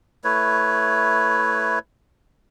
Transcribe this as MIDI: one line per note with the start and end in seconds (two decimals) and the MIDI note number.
0.24 1.79 57
0.24 1.79 64
0.24 1.79 71
0.24 1.79 73